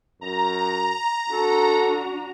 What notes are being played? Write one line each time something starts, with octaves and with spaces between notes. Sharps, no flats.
F#2 A#5
D4 F#4 A4